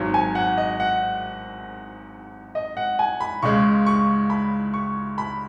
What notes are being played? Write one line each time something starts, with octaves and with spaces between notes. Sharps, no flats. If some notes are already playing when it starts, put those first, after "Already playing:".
Already playing: G#1 G#2 F#3
G#5
F#5
D#5
F#5
D#5
F#5
G#5
B5
C#2 C#3 G#3 C#6
C#6
B5
C#6
B5